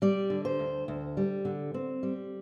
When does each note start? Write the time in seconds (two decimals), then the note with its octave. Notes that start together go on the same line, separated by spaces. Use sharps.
0.02 G3 D5
0.30 D3
0.45 C5
0.59 D2
0.88 D2
1.17 G3
1.45 D3
1.74 C4
2.03 G3